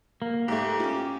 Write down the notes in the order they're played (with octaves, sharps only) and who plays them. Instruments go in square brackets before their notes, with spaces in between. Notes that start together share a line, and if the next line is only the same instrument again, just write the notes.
[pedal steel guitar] A#3
[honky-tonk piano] G#2 A3 [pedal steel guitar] G4
[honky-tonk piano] C#4 F4